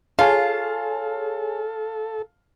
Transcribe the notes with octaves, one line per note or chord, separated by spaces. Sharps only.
F4 G#4 A4 C#5 F5 G#5 A5